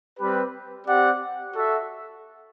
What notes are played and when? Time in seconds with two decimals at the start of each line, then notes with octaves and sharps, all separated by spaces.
0.19 G3 C4 G4 B4
0.87 C4 G4 D5 F#5
1.55 F#4 A4 E5